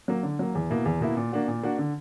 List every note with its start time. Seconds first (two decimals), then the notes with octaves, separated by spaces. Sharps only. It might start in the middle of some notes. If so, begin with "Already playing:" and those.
0.08 F#3 A#3
0.23 D3
0.39 F#3 A#3
0.55 E2
0.70 B2 A#3 E4
0.85 E2
1.00 B2 A#3 E4
1.17 A#2
1.32 A#3 D4 F#4
1.48 A#2
1.63 A#3 D4 F#4
1.78 D3